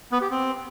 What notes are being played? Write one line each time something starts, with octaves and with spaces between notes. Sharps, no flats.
B3
G4
C4